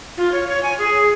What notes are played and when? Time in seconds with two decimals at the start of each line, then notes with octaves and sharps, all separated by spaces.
0.17 F4
0.32 C#5
0.47 C#5
0.63 G#5
0.79 G#4